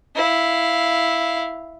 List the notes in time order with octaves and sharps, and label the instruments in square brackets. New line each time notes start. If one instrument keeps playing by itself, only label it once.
[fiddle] E4 F5